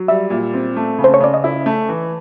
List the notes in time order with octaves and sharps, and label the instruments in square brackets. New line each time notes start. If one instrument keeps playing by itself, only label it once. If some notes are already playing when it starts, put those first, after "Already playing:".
Already playing: [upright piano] F#3
[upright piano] G3 [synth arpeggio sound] E5
[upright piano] A#2
C4
A3
C#3
[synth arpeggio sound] C5
C#5
[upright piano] C#3 [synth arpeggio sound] D5
[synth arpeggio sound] D#5
[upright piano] E4 [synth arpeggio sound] E5
[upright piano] A3
E3